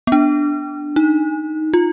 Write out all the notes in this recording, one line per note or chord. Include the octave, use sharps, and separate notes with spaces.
B3
D4
D#4
F4